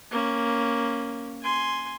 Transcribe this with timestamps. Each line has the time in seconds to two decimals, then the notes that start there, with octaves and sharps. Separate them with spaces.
0.11 A#3 C#4
1.43 G#5 C6